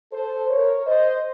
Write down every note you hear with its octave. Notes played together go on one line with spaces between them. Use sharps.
A4 C5
A#4 C#5
C5 D#5